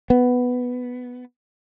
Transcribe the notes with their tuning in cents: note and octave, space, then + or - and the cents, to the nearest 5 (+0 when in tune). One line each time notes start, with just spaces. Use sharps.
B3 +5